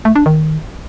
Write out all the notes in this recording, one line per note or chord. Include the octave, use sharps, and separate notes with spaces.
A3
D4
D#3